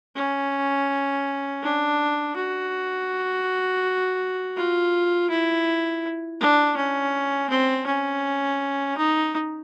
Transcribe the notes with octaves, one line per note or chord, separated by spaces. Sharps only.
C#4
D4
F#4
F4
E4
D4
C#4
C4
C#4
D#4